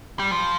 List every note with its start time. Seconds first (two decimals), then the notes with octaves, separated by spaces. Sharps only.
0.19 G3
0.31 F3